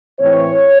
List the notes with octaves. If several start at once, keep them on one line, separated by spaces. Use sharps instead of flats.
A2 E3 C4 C#5